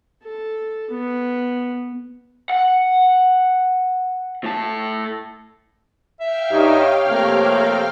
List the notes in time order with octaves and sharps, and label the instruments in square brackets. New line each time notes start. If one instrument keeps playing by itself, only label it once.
[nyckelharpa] A4
B3
[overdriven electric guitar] F#5
A2 A5
[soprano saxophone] E5 [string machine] F5 G5 F6
[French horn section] G2 D#4 [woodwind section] G4 C#5
[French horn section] C3 F3 A3 [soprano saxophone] A#3